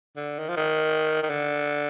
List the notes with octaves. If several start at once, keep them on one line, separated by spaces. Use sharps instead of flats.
D3
D#3
F3
D#3
D#3
D3